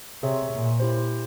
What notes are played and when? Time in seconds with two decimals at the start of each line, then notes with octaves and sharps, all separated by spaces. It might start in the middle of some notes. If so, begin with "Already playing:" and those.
0.23 C3 G#4 C#5 E5
0.52 A#2
0.80 E4 G4 C5